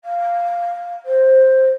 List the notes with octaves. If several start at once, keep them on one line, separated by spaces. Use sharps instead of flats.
F5
C5